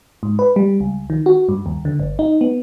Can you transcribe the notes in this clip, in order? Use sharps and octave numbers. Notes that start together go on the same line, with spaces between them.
G#2
B4
G3
C#2
D#3
F#4
G2
D#2
D3
G1
D#4
B3